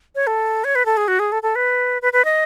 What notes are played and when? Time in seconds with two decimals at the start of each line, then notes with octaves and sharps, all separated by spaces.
0.15 C#5
0.27 A4
0.64 C#5
0.75 B4
0.86 A4
0.97 G#4
1.08 F#4
1.19 G#4
1.32 A4
1.43 A4
1.56 B4
2.02 B4
2.13 B4
2.25 D#5